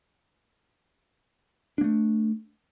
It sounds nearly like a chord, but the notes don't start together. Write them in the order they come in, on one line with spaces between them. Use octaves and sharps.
D4 A#3 A3